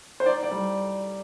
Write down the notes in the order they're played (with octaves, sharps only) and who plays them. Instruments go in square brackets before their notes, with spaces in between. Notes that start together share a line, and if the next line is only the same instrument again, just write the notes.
[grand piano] C5
D#4 D5
D5
G3